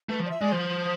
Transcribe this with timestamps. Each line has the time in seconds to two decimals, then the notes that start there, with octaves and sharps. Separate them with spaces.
0.09 A3 B4
0.20 F3
0.25 D5
0.30 E5
0.41 G#3 D5
0.52 F3 C5